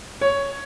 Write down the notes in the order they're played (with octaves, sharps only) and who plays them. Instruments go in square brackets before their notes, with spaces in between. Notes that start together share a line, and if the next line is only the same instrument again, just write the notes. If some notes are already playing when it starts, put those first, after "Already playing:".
[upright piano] C#5